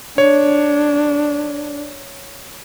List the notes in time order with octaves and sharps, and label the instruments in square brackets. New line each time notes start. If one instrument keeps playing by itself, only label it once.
[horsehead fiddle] D4 [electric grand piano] C#5